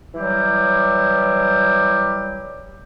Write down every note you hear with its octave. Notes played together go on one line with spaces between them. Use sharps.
E3 F#3 G3 G4